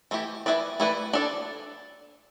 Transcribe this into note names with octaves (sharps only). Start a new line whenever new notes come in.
E3 A3 E4 G4
E3 A3 E4 B4 D5
E3 A3 E4 B4 D5
D4 A4 D5